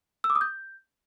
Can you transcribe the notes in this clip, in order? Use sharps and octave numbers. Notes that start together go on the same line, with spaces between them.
E6
D6
D#6
G6